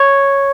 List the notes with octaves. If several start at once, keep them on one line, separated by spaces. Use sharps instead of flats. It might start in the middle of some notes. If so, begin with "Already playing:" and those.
Already playing: C#5